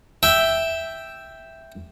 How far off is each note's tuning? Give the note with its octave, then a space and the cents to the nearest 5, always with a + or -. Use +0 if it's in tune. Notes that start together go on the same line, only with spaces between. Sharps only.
E5 +0 G5 +0